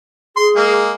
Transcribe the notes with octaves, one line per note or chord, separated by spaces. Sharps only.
G#4 C6
G#3 A#3